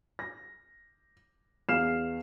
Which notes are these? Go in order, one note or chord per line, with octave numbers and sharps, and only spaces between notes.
A#6
E2 F5 F6 C7 E7